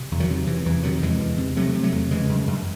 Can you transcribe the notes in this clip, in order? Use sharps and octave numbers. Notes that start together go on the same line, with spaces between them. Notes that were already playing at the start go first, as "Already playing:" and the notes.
Already playing: C3
E2
D#3 F#3
C3
C3 E3
E2 E3
C3 D#3 F#3
E2 E3 G#3
E2
C3
C3 F#3 A3
C3
F#3 A3
E2
C#3 E3 G#3
F#2
F#2